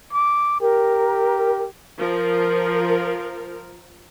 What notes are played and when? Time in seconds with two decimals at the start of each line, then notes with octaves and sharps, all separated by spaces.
0.13 D6
0.60 G4 A#4
1.98 F3 A#4